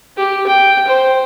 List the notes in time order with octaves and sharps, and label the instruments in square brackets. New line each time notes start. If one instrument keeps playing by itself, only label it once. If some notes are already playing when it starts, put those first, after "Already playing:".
[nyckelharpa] G4
G5
C5